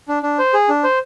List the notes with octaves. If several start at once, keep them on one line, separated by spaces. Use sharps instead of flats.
D4
D4
C5
G#4
D4
C5